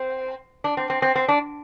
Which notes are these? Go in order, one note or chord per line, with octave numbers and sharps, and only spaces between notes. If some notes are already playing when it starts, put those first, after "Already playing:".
Already playing: C4
D4
C4
C4
C4
C4
D4